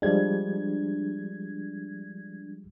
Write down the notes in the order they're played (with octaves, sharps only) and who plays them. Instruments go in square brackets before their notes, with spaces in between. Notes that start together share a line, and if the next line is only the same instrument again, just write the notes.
[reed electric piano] F3 G3 G#3 [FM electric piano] D4 G#6